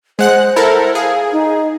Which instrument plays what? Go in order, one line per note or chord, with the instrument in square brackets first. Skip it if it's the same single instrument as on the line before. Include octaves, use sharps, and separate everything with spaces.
[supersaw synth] G#3 F#5 F#6 [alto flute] C5
[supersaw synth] E4 A4 A#4
[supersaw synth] G#4 [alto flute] F5
[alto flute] D#4